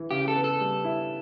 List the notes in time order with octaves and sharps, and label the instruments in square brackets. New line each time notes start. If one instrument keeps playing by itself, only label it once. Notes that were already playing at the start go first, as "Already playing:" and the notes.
Already playing: [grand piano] E3
[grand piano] C#3 [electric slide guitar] G4
[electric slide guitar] A4
[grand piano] B3
[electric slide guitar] A4
[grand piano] G3
E4